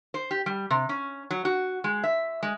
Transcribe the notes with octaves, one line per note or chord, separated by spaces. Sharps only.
C5
G4
G3
C3
C#4
F#3
F#4
G#3
E5
G#3